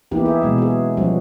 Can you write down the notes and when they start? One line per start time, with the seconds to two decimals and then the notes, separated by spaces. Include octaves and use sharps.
0.11 E3 A#3 B3 D#4 E4 G4
0.26 G#4 E5
0.42 B2 F#3 G#3
0.58 F#4 G#4
0.97 F3 G3 B3 C#4 F#4